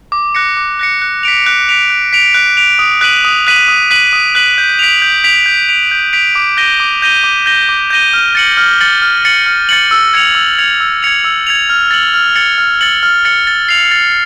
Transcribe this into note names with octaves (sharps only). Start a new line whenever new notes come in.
D6
F#6 A#6 C#7
D6
F#6 A#6 C#7
F#6
B6 D7 F7
F#6
B6 D7 F7
F#6
B6 D7 F7
F#6
B6 D7 F7
D#6
F#6 B6 D#7 F#7
D#6
F#6 B6 D#7 F#7
D#6
F#6 B6 D#7 F#7
D#6
F#6 B6 D#7 F#7
G6
B6 D7 F7
G6
B6 D7 F7
G6
B6 D7 F7
G6
B6 D7 F7
D6
G6 A#6 D#7 G7
D6
G6 A#6 D#7 G7
D6
G6 A#6 D#7 G7
D6
G6 A#6 D#7 G7
F6
A6 C#7 F#7
F6
A6 C#7 F#7
F6
A6 C#7 F#7
F6
A6 C#7 F#7
E6
G#6 C#7 F7
E6
G#6 C#7 F7
E6
G#6 C#7 F7
E6
G#6 C#7 F7
F6
A6 C#7 F#7
F6
A6 C#7 F#7
F6
A6 C#7 F#7
F6
A6 C#7 F#7
A6
C7 F7
A6